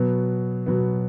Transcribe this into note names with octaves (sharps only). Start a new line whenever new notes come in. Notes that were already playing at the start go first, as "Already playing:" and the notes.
Already playing: B2 F#3 B3
B2 F#3 B3